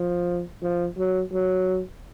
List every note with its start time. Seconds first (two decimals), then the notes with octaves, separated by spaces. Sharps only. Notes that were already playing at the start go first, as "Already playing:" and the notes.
Already playing: F3
0.62 F3
0.98 F#3
1.32 F#3